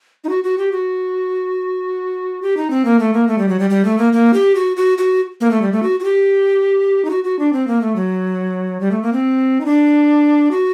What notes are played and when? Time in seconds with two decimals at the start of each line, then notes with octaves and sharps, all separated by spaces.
0.24 D#4
0.29 F#4
0.44 F#4
0.58 G4
0.72 F#4
2.42 G4
2.57 D#4
2.70 C4
2.85 A#3
2.99 A3
3.13 A#3
3.28 A3
3.38 G3
3.49 F#3
3.60 G3
3.70 G3
3.85 A3
3.98 A#3
4.13 A#3
4.34 G4
4.55 F#4
4.77 F#4
4.98 F#4
5.41 A#3
5.51 A3
5.62 G3
5.72 A3
5.83 F#4
6.00 F#4
6.04 G4
7.05 D#4
7.10 F#4
7.24 F#4
7.39 D4
7.53 C4
7.67 A#3
7.81 A3
7.96 F#3
8.81 G3
8.91 A3
9.02 A#3
9.13 C4
9.61 D#4
9.66 D4
10.51 F#4